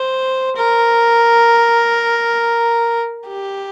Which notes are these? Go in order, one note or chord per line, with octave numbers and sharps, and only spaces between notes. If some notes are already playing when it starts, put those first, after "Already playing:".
Already playing: C5
A#4
G4